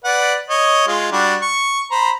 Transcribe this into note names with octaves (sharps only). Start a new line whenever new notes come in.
B4 D5 F#5
C#5 D#5
G#3 F4
G3 D4 F#4
C#6
C5 A#5 B5